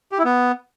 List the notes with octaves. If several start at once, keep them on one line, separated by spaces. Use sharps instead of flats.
G4
E4
B3